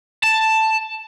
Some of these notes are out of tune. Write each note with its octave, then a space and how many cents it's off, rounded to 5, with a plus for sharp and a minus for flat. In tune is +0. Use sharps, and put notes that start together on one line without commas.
A5 +5